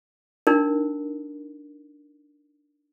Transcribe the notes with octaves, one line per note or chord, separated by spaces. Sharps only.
D4 D#4 A#4